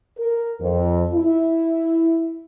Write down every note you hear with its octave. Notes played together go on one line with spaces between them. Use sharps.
A#4
F2
E4